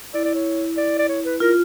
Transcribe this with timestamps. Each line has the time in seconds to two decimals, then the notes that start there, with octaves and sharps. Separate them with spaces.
0.14 E4 D5
0.24 D5
0.35 C#5
0.77 D5
0.99 D5
1.09 C#5
1.25 B4
1.40 F4 A#4